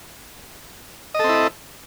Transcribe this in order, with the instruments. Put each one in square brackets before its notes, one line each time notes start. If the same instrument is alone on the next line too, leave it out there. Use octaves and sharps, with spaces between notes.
[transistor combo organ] D#5
A4
C4
E4